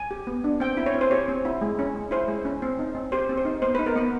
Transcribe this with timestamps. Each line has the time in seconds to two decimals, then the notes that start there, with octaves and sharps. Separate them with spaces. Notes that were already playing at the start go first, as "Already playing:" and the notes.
Already playing: G#5
0.11 G4
0.27 B3
0.44 D4
0.60 C4 G5
0.77 E4
0.86 C#5
0.94 C4
1.01 C5
1.11 G4 C#5
1.28 C4
1.45 E4
1.61 G#3
1.79 C#4
1.95 G#3
2.11 E4 C5
2.28 G#3
2.45 C#4
2.62 C4
2.79 D#4
2.95 C4
3.12 G4 C5
3.29 C4
3.37 C5
3.45 D#4
3.62 B3 C5
3.75 D#4 B4
3.86 A#4
3.96 B3 B4